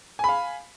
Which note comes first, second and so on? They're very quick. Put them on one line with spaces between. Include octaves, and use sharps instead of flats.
G#5 B5 F5